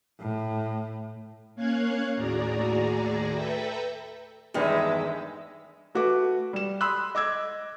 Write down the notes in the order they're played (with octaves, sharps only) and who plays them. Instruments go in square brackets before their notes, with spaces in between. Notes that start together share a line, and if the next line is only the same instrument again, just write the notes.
[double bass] A2
[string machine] A#3 C#4 C#5 F5 F#6 G#6
D#2 A2 F#4 G#4 D5 A#5
A4 B4 E5 G5 A#5
[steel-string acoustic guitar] E2 G2 D#3 [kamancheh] G#3 E5
[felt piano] A3 F#4 B4 D6
G3 E7
B5 C6 D#6 E6 F#6
D#5 D6 E6 G#6